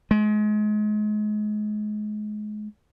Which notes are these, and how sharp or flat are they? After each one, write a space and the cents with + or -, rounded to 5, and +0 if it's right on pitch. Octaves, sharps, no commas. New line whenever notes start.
G#3 +30